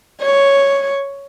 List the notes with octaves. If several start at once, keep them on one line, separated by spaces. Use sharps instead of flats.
C#5